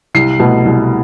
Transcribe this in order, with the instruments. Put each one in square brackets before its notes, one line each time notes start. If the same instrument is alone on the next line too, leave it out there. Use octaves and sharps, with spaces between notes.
[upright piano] C2 C7
B2 A3
C2